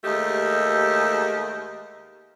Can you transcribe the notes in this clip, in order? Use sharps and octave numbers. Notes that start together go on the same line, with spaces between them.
D#2 G#3 A3 G4 D#5